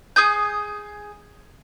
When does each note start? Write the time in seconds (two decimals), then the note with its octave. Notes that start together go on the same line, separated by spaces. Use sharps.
0.16 G#4 D#6 G6